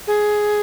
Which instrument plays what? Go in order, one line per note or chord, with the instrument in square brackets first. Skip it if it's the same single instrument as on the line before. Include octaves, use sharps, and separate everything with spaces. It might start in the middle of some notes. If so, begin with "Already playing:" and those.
[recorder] G#4